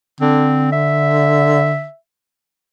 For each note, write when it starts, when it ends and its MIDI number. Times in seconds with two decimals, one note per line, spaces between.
0.21 1.85 50
0.21 0.69 60
0.72 1.96 76